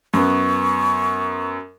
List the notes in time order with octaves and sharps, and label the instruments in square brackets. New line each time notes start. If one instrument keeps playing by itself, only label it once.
[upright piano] F#2 B3 [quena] C#6